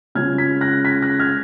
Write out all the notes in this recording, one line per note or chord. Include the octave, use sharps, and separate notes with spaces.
C#3 G#3 C#4 F4 F6 G#6
G#6 B6
F#6 A#6
G#6 B6
F#6 A#6
F6 G#6